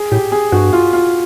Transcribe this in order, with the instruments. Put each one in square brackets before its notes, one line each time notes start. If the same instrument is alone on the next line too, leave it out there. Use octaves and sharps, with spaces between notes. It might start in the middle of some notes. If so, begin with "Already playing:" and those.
Already playing: [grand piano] G#4
[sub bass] A2 [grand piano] G4
[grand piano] G#4
[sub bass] G2 [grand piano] F#4
[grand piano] F4
F4